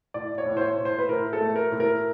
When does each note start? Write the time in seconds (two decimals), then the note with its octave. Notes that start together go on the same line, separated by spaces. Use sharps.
0.14 A2 D5
0.38 C#5
0.45 A2
0.57 C5
0.61 C#5
0.78 A2
0.85 C5
0.98 B4
1.09 A2 A#4
1.33 A4
1.41 A3
1.56 A#4
1.72 A2
1.80 A#4